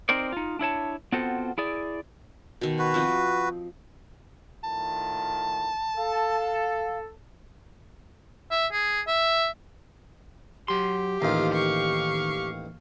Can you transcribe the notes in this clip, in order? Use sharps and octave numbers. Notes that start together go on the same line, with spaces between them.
C4 D#4 A#4 C5 D5
D#4 F4
D4 E4 C#5 A5
B3 C4 F4 F#4 A4 C5
E4 G#4 D5
B2 D#3
F#4 B4
F3 C4 D#5
A2 D#3 F4 A5
A4 F5
E5
G#4
E5
F#3 G4 C6
A1 D#2 D#3 F4 F5
F5 C#6